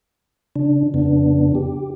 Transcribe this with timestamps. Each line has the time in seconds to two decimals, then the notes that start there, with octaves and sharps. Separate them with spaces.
0.56 C#3 D4
0.94 F2 C#3 B3 D4
1.55 G4